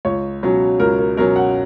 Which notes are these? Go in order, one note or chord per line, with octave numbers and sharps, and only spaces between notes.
C#2 C#5
B2 F#3 C#4
C#2 A#4
A#4
B2 F#3 C#4 A#4
F#5